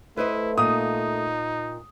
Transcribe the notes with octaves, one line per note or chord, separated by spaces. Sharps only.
A3 E4 B4 C5 D#5
A#2 D#4 F5 D#6